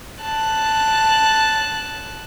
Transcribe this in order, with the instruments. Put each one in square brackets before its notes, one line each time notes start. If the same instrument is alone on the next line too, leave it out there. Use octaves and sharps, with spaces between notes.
[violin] A5 F#6